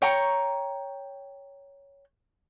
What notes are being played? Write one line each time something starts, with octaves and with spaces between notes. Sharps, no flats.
C#5 G5 A#5 C#6